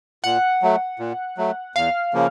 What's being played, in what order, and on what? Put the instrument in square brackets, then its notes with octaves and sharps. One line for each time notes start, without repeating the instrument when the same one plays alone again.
[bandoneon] A#2 [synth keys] F#5
[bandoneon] F#3 A3
A#2
F#3 A3
[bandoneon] E2 [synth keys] F5
[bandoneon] C#3 F3 A#3